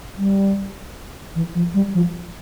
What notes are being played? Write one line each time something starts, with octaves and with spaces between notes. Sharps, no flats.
G3
E3
F3
G3
F3